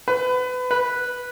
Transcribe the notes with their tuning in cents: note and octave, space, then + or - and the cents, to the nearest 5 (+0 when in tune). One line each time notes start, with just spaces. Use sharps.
B4 +25
B4 -5